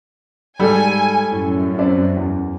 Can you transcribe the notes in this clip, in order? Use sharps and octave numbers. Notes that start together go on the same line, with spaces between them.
G#2 G3 A4 D5 G#5
F#2 A2
C4 D5 E5
E2